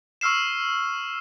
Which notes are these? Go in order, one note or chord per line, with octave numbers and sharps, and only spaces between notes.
C#6 E6 F6 C7 E7